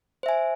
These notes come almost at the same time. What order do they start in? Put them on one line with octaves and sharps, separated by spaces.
C5 E5 G#5